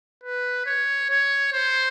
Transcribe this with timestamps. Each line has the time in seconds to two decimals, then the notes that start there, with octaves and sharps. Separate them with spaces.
0.23 B4
0.66 C#5
1.10 C#5
1.53 C5